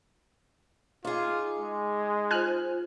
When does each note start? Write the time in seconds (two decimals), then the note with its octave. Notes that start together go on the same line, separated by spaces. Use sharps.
1.05 D#4 F4 G#4 D6
1.59 G#3
2.31 F4 C5 G#5 F6 F#6